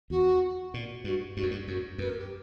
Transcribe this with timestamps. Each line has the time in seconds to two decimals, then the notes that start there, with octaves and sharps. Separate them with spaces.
0.10 E2 F#4
0.74 A#2
1.04 G2 F#4
1.36 G2 F#4
1.43 F#2
1.51 G2
1.68 F#2 F#4
1.98 F#2 B4
2.09 A#4
2.18 G4